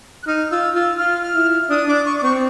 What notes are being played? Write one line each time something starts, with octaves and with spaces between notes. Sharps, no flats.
F#6
D#4 F6
F4 E6
F4 E6
F4 F6
F6
E4
D4 D#6
D4 D6
C#6
D6
C4 C#6